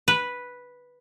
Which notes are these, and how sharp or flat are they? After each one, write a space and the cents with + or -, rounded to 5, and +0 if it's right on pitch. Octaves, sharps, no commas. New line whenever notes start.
B4 -5